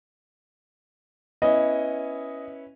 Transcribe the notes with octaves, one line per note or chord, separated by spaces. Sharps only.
B3 C#4 E4 D#5